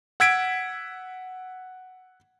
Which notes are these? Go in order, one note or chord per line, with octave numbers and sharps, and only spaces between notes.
F#5 E6 G#6 B6 D7